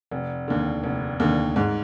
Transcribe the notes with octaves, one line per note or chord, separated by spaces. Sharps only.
F1
D#2 D3
F1
D#2 D3
G#2